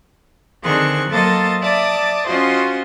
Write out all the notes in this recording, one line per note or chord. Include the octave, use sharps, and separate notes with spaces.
D3 D#3 C4 G#4 C#6 F#6
F#3 A#3 A4 C5 D#5 A6
D5 E5 A5 D6 D#6
C#4 F4 F#4 C5 D#5